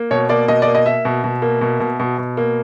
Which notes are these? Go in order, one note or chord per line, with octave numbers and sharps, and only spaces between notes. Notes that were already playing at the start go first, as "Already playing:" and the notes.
Already playing: A#3
B2 C#5
A#3 D5
B2 D#5
D5
A#3
D#5
A#3 E5
B2
B2
A#3
B2
B2
B2
B2
A#3